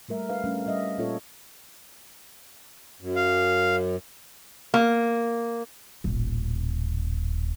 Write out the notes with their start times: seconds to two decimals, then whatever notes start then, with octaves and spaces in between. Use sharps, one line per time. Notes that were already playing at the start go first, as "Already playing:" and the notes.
0.09 G3 A3 A#4 E5
0.29 D4 B4 F5
0.44 G3 A3 C#4 D4
0.66 G3 C#4 D#5 E5
0.98 A#2 A#3 C#4 F4 A4 C#5
3.01 F#2
3.16 F5
4.74 A#3
6.04 D#1 A1